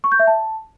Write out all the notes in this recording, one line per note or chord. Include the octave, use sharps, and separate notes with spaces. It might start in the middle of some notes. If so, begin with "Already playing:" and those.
C#6
G6
E5
A5